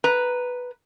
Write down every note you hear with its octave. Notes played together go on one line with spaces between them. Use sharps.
B4 A#5